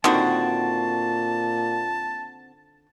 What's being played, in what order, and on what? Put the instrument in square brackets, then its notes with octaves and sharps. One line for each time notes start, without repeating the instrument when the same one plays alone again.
[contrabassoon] A#2 [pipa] D3 D#3 [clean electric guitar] C4 F#4 [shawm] A5